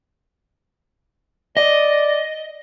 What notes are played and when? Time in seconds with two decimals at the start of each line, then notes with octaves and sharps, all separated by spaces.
1.57 D5 D#5